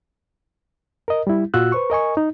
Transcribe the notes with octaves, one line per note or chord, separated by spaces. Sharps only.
A#4 D#5
G3 E4
A#2 F4 F#4 E6 F#6
B4 C5 C#6
A#4 D#5 G#5 C#6
D#4